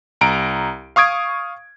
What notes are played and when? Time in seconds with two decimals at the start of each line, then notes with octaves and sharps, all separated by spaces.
0.21 C2 A#5 D7
0.96 F5 C#6 D#6 G#6 D7